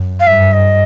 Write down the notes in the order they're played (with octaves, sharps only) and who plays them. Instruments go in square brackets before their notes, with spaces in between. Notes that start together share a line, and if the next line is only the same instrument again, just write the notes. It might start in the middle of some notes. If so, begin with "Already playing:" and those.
Already playing: [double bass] F#2
[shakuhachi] F5
[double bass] G2 [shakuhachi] E5
[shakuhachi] D#5